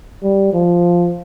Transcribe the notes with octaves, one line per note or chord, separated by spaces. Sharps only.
G3
F3